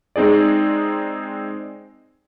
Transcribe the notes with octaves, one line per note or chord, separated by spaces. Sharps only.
G#3 C4 D#4 G#4 D5